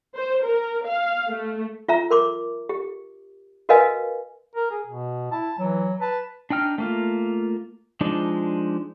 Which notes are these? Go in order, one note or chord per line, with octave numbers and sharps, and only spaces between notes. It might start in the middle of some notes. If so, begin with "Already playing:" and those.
C5
A#4
F5
A3
F4 E5 A#5
A#4 C6 D6
G4
F#4 A#4 B4 D#5 F5 G#5
A#4
G#4
B2
E4 A5
E3 F#3
B4 A5
D4 D#4 G5 F6
A3 A#3 F4
F3 G#3 D4 D#4